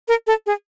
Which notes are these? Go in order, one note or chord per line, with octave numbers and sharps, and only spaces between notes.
A#4
A4
G#4